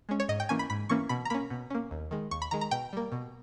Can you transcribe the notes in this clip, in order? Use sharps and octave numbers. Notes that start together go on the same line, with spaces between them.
G#3 C#4
C#5
G#2 D#5
G5
E3 A#3 C#4 G#5
B5
G#2 B5
E3 A#3 C#4 C#6
B2 B5
A#5
A#3 C#4 B5
B2
A#3 C#4
D#2
D#3 G#3
D#2 C#6
B5
D#3 G#3 A#5
A#5
B2 G5
G3 A#3
B2